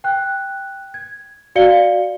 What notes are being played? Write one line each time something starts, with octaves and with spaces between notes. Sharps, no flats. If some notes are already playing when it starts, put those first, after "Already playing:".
G5 F#6
G#6
F#4 D5 F5 C#7 G7